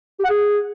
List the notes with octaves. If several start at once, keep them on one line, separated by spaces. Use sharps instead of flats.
G4
F#5
G#4